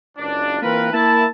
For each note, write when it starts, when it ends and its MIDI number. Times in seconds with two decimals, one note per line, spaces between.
0.18 0.59 30
0.18 0.59 37
0.18 0.59 62
0.62 0.92 52
0.62 0.92 58
0.62 0.92 60
0.62 0.92 65
0.62 0.92 70
0.62 0.92 71
0.93 1.25 58
0.93 1.25 64
0.93 1.25 81